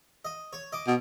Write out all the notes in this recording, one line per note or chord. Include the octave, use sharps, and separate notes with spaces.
D#5
C#5
D#5 D6
B2